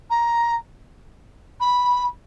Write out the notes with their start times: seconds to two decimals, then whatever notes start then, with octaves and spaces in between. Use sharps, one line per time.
0.10 A#5
1.61 B5